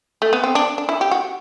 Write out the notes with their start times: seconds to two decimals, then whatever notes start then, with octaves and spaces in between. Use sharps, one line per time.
0.22 A3
0.33 B3
0.44 C4
0.55 D4
0.78 D4
0.89 E4
1.01 G4
1.11 F#4